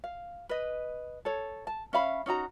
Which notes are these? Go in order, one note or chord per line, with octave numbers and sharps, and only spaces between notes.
F5
B4 D#5
A4 C#5
A5
C#4 E5 F5 B5
C#4 D#4 F#4 A#5